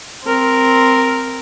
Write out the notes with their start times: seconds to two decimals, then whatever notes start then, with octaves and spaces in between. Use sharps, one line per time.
0.24 C4 A#4